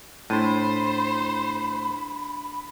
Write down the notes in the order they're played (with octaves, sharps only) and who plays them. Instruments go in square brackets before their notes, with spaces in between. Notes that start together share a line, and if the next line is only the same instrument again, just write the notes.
[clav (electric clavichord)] A2 [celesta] D4 A6 D#7 [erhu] C5 [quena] B5